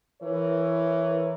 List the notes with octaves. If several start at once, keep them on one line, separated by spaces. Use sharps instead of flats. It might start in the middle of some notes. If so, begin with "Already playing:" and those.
E3 E4 A#4 C#5